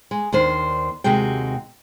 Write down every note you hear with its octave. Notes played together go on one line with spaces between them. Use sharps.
G#3
D#2 D#3 D4 C5
D#2 C3 G#3 F#4 G5